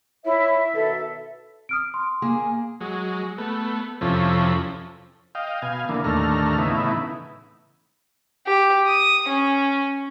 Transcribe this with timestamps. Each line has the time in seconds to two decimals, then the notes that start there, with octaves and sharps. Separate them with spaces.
0.25 E4 C#5 E5
0.74 B2 D#3 A4 B4
1.69 D#6 F6 D7
1.94 C6
2.22 A#3 G#4 G#5
2.81 F#3 G#3
3.38 A3 B3
4.01 F2 C3 F3 C#4 E4 A4
5.35 D#5 F5 G5
5.62 B2 F5 G#5
5.89 D3 E3 A#3
6.04 D#2 A2 D3 A3 A#5 F6
6.58 A2 C#3 E3 B3 D#4 E4
8.46 G4
8.86 D#6
9.28 C#4